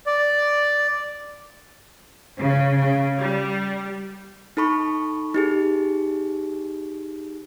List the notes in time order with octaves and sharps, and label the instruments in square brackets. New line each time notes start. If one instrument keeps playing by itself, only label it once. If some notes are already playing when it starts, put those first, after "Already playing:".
[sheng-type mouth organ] D5
[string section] C#3
C#3
G3
[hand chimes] D#4 A4 B5 C#6
D#4 G4 G#4